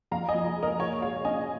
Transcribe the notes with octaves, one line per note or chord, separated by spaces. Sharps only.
F2 F5 A#5
D#5 G#5
F3
G#3
A#4 D#5
A#2 C#5
G#3 C#5 F5
C#4 D#5 G#5